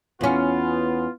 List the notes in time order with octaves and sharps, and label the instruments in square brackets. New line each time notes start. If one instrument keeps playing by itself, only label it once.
[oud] E2 C#4 [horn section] B3 F4